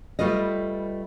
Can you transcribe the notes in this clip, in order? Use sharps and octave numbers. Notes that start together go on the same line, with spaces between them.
G3 A3 F4 B4 D#5